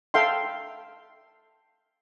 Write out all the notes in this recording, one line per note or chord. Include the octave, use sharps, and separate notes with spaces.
A4 E5 F5 G5 C6